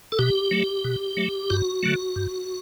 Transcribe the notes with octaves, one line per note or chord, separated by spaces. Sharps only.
A4
B2 G4
F#3 A3
B2
F#3 A3
G2 F#4
D3 F#3 A3
G2